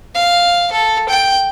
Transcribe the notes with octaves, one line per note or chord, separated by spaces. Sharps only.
F5
A4
G5